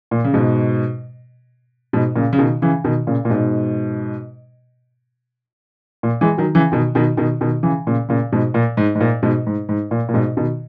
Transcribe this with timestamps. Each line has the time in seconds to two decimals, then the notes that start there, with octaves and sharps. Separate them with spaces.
0.11 A#2
0.24 C#3
0.33 G#2 B2
1.93 G#2 B2
2.16 A#2 C#3
2.33 C#3
2.38 B2 D#3
2.62 C#3 E3
2.84 B2 D#3
3.07 A#2 C#3
3.25 A#2
3.30 G#2 B2
6.03 A#2
6.21 E3 G#3
6.38 D#3 F#3
6.55 C#3 E3
6.72 B2 D#3
6.95 B2 D#3
7.17 B2 D#3
7.41 B2 D#3
7.63 C#3 E3
7.87 A#2 C#3
8.09 A#2 C#3
8.32 G#2 B2
8.54 A#2
8.77 G#2
8.95 G#2
9.01 A#2
9.23 G#2 B2
9.47 G#2
9.69 G#2
9.91 A#2
10.09 A#2
10.14 G#2 B2
10.37 B2 D#3